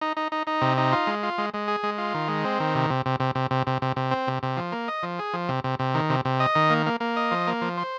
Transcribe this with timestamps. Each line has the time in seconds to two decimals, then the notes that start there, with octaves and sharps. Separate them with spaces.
0.01 D#4
0.17 D#4
0.32 D#4
0.47 D#4
0.61 C3
0.77 D#4
0.92 F4
1.07 G#3
1.23 F4
1.38 G#3
1.54 G#3
1.68 G#4
1.83 G#3
1.98 F4
2.14 D#3
2.29 G#3
2.44 C4
2.60 D#3
2.75 C3
2.90 C3
3.06 C3
3.20 C3
3.35 C3
3.51 C3
3.67 C3
3.82 C3
3.96 C3
4.11 C4
4.27 C3
4.43 C3
4.57 F3
4.72 A#3
4.88 D#5
5.03 F3
5.19 G#4
5.33 F3
5.49 C3
5.64 C3
5.79 C3
5.95 D#3
6.09 C3
6.25 C3
6.40 D#5
6.55 D#3
6.70 A#3
6.86 A#3
7.00 A#3
7.16 D#5
7.31 F3
7.47 A#3
7.61 F3
7.77 C5